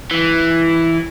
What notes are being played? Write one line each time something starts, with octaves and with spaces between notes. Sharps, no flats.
E3